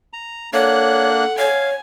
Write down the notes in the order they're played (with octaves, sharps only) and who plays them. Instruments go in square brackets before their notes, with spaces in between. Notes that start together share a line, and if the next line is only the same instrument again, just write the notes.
[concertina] A#5
[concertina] A#3 D4 F#6 [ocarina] A4 [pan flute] C#5 [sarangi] F#5
[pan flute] C#5 [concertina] F5 [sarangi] G#5